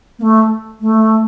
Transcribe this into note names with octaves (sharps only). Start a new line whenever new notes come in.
A#3
A3
A3